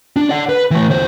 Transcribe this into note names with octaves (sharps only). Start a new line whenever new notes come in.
D4
D5 F#5
B4
E3 A3
E2 C5